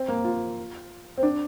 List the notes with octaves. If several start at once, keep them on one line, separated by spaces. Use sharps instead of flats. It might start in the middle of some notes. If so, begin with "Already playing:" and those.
Already playing: C4
A#3
F4
C4
D4